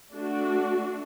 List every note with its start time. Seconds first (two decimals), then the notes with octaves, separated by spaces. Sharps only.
0.13 A3 D4 F#4